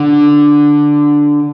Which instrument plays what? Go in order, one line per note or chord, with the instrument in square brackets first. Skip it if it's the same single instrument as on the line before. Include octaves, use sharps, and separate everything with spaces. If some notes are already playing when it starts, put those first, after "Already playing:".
Already playing: [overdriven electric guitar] D3